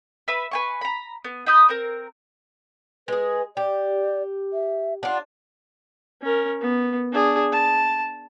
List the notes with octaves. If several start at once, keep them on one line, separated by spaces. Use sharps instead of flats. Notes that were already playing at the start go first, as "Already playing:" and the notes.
B4 E5 B5
B4 G#5 C#6
A#5 B5
B3
D#4 B5 D#6 G6
C4 A#4
G#3 G#4 B4
G4 D5
E5
D4 F4 F#5
C#4 A#4
B3
D4 G#4
A5